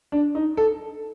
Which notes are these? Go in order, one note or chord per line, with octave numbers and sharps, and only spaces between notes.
D4
D#4
A4